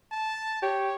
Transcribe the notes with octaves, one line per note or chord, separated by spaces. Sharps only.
A5
G4 C#5